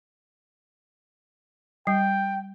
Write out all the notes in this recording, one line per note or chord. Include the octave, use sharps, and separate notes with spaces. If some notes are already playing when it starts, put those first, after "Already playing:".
G3 G5